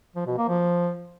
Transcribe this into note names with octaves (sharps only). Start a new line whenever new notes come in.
F3
B2
A#3
F3